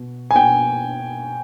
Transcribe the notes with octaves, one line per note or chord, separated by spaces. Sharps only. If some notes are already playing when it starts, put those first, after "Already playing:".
Already playing: B2
G#5
B2 G5